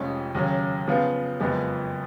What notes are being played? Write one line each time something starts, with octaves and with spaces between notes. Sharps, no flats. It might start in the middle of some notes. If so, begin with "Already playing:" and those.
Already playing: F1 F2 F3 G#3 C#4
D#2 C#3 F#3 C#4
C#3 F3 B3 F4
F#1 F2 F3 G#3 B3